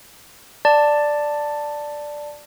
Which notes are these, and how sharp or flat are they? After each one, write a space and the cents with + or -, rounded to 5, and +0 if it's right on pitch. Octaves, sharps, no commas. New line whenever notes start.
D5 +5 A5 +10